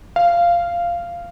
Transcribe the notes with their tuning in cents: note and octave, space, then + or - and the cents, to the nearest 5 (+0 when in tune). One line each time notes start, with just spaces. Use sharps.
F5 -10